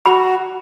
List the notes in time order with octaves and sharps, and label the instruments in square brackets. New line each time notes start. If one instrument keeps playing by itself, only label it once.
[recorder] F#4 [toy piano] B5